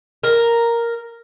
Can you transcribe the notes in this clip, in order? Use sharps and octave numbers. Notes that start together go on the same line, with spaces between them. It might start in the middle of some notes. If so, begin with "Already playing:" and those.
A#4